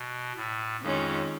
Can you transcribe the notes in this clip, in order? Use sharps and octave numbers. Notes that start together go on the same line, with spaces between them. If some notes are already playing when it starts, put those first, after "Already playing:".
Already playing: B2
A2
F2 D#3 G#3 C#4 F4